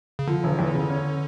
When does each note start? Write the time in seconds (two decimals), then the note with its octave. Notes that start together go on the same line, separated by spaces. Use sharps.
0.19 C#3
0.27 D3 F3
0.44 E1
0.59 E2
0.74 C#3
0.90 C#4